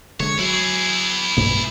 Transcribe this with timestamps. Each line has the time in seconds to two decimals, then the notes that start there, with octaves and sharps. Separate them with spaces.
0.20 D3 G#3 C#5
0.39 F#3 E4 G#4
1.36 B1 G2 A#3